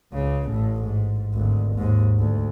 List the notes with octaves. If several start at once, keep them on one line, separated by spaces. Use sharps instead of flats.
C#2 C#3
A1 A2
G#2
G#1 D2
D#2 G#2
D2